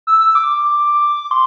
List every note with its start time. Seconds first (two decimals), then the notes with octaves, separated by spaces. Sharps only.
0.07 E6
0.21 E6
0.35 D6
1.31 C6